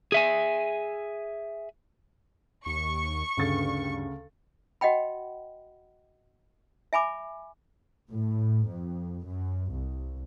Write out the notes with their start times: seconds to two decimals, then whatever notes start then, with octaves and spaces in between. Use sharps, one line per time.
0.12 G#4 E5 G#5
2.66 D#2 C#6
3.37 D2 G2 C#3 A6
4.81 F#4 D#5 F#5 G5 B5
6.93 E5 G#5 B5 D6
8.10 A2
8.67 F2
9.26 F#2
9.71 C2